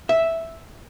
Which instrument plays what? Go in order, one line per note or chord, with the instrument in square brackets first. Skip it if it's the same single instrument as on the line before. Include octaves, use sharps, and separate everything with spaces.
[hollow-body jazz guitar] E5